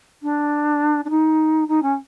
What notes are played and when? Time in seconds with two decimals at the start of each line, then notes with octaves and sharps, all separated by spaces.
0.23 D4
1.05 D4
1.10 D#4
1.68 D#4
1.83 C#4